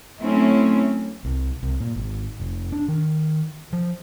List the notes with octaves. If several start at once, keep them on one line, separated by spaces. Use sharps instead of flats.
F#3 A3 C4 C#4 E4
C2
C2
A#2
G#1
F1
D4
D#3
F3